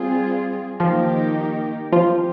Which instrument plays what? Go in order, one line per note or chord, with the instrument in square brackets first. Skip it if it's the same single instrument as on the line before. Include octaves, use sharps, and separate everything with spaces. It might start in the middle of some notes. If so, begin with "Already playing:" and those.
Already playing: [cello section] G3 C4 F4 G#4
[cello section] D#3 A#3 D#4 G4 A#4 [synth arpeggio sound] F3 F4
[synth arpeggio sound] F3 F4 [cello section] G#3 C4 G4